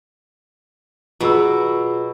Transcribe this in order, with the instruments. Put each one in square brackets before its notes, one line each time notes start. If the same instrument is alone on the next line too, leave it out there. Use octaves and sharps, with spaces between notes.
[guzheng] B2 F#3 [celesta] F4 G#4 E6